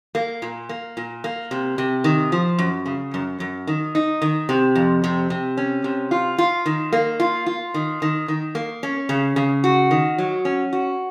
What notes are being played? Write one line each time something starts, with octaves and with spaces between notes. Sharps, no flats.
A#3
A#2
A#3
A#2
A#3
C3
C3
D#3
F3
F#2
C#3
F#2
F#2
D#3
D#4
D#3
C3
F2
C3
C3
C#4
C3
F4
F4
D#3
A#3
F4
F4
D#3
D#3
D#3
A#3
C#4
C#3
C#3
F#4
D#3
F#3
C#4
F#4